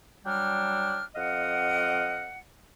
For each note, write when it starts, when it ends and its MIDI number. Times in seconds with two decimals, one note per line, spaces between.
0.25 1.02 54
0.25 1.02 55
0.25 1.02 62
0.25 1.02 79
0.25 1.02 89
1.15 2.36 41
1.15 2.36 75
1.15 2.36 77
1.15 2.36 78